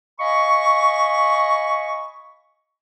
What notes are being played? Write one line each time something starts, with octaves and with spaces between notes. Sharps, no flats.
D#5 F5 G#5 B5 C#6